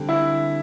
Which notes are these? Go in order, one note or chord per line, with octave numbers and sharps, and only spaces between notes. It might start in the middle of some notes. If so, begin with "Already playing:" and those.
Already playing: D3 G3 C4 G4
E4